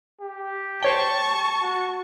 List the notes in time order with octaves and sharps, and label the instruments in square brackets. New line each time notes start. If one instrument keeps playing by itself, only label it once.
[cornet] G4
[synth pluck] C5 C#5 G5 [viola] A5 C#6
[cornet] F#4